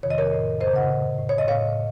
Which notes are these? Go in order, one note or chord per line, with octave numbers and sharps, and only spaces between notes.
F2 C3 D#3 C#5
D#5
A#4 C#5
A2
F#2 C#3 C5 D#5
D#5 F#5
A2
A2
C#5
D#5
A2 C#5 F5